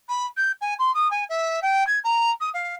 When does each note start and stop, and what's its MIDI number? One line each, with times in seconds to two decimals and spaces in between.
0.09 0.26 83
0.37 0.52 91
0.61 0.74 80
0.79 0.93 84
0.94 1.10 87
1.11 1.24 80
1.29 1.60 76
1.62 1.86 79
1.87 1.99 92
2.04 2.30 82
2.40 2.49 87
2.54 2.75 77